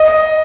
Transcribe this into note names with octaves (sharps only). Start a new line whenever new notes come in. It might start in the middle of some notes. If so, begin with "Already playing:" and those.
Already playing: D#5